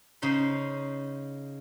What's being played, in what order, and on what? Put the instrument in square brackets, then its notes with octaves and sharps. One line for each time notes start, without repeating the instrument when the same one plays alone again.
[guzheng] C#3 D#4 C5 B5